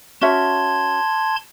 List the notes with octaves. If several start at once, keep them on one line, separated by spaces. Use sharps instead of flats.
C#4 F#4 E5 A5 C6 G#6